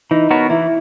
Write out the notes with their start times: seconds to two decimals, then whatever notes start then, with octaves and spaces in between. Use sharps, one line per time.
0.11 E3 D#4
0.31 B3 F#4 A#4 C#5
0.50 E3 E4